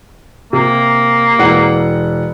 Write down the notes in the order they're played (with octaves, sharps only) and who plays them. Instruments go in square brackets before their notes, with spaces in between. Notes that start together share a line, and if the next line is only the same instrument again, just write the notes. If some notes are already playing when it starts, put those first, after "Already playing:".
[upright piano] C3 [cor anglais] A#3
[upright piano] E1 E3 F#5